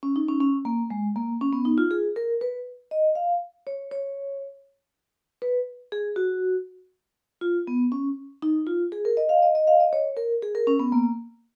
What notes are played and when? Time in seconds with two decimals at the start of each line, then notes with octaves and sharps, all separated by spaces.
0.03 C#4
0.16 D#4
0.28 C#4
0.40 C#4
0.65 A#3
0.90 G#3
1.16 A#3
1.41 C#4
1.53 B3
1.65 D#4
1.78 F4
1.91 G#4
2.16 A#4
2.41 B4
2.91 D#5
3.15 F5
3.67 C#5
3.91 C#5
5.42 B4
5.92 G#4
6.16 F#4
7.41 F4
7.67 B3
7.92 C#4
8.42 D#4
8.67 F4
8.92 G#4
9.05 A#4
9.17 D#5
9.29 F5
9.42 D#5
9.55 D#5
9.67 F5
9.80 D#5
9.93 C#5
10.17 A#4
10.42 G#4
10.55 A#4
10.67 C#4
10.79 B3
10.92 A#3